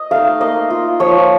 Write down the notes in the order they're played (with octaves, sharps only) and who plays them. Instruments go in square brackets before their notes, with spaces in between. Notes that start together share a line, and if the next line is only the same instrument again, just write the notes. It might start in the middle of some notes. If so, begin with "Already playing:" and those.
Already playing: [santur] D#5
A3 D#4 F5
A#3 D#5
F4
F3 C#5